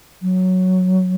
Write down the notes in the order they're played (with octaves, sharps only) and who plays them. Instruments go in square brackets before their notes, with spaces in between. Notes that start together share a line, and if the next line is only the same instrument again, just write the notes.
[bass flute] F#3